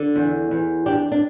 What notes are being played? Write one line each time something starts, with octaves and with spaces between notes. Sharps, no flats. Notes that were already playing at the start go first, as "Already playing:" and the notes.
Already playing: D3
E2
E2
D4 G4
D4